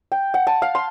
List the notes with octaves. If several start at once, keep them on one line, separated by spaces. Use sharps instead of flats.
G5
F#5
A5
F5
C6